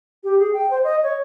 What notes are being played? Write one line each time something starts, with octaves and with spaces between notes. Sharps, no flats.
G4
G#4
G5
C5
D#5
C#5